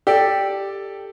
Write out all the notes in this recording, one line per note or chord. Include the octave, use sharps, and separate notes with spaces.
G4 A4 D5